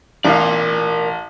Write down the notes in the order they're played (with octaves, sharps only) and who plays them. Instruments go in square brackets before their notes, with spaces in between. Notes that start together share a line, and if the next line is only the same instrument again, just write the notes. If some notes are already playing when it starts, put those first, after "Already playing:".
[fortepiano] A1 F5 [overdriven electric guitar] A#4 D5